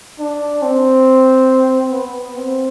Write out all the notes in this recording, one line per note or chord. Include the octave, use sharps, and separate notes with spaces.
D4
C4
B3
C4